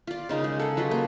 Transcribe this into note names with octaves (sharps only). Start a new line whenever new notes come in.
F4 D5
C#3 D#4 A#4
G#3
A4 F#5
F#3 F4 B4 D#5
A#3